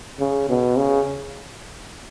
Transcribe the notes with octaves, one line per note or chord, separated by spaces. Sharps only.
C#3
B2
C#3